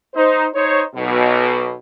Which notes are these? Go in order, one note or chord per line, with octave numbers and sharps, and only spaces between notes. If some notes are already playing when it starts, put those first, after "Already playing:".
D#4 C5
D#4 C5 C#5
B1 B2